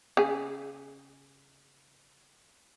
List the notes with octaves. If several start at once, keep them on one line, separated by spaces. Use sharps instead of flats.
C#3 G#4